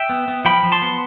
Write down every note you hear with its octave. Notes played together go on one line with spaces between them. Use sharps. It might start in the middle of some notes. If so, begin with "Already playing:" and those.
Already playing: E5 G5
B3
B3
F3 G5 B5
F3
A5 C6
B3